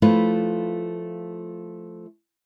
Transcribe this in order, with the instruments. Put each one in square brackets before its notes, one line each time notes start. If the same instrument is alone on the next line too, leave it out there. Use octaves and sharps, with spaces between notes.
[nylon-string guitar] F3 A3 E4 F4 B4